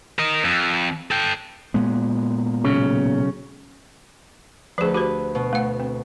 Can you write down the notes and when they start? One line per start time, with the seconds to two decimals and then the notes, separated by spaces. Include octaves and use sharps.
0.19 A#4 D#5
0.45 F2
1.11 A4 G5
1.74 A#2 G#3 B3
2.64 B1 C#3 C#4
4.78 D2 F3 G#4 B4
4.94 F#4 G4 B4 C5
5.35 B2
5.53 A3 F#5
5.80 C4